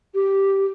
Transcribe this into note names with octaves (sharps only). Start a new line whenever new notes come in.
G4